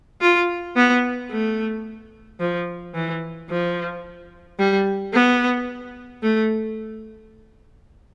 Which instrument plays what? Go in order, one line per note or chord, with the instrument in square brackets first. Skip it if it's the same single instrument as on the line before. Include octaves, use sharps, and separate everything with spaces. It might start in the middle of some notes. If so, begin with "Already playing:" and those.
[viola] F4
B3
A3
F3
E3
F3
G3
B3
A3